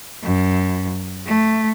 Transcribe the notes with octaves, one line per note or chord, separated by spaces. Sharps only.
F#2
A3